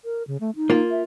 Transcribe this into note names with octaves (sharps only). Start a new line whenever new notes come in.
A#4
C#3
A3
D#4
A#3 F4
E5